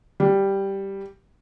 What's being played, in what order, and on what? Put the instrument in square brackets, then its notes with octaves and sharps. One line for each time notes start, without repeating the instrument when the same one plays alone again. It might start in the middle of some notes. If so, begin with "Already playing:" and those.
[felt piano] G3